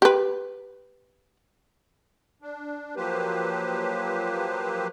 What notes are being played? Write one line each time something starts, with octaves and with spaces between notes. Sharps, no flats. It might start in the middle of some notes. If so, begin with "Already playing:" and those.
G4 B4
D4
F3 F#3 A#3 G4 B4 C5